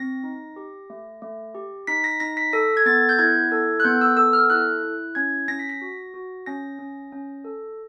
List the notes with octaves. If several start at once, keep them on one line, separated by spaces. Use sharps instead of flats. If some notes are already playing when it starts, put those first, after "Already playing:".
Already playing: C4 A#6
D#4
G4
A3
A3
G4
D#4 B6
A#6
D#4 A#6
B6
A4 A#6
G#6
B3 A6
G6
E4 G#6
A4
F#6
B3 G6
E6
A4 E6
F6
E4 F#6
E4
C#4 G#6
C#4 A#6
B6
A#6
F#4
F#4
C#4 A#6
C#4
C#4
A4